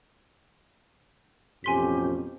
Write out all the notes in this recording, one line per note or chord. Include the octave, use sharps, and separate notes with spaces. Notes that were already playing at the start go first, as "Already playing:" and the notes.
A1 F2 B2 C#4 G4 G#5 C6 B6